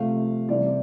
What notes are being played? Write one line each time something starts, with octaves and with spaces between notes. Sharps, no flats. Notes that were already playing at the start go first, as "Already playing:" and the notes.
Already playing: C3 F3 A3 F5
C3 E3 G3 C4 D5